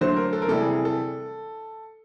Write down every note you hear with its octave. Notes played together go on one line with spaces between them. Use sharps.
D3 F#3 A3 C5
A#4
A4
A#4
C3 E3 G3 A4
G#4
A4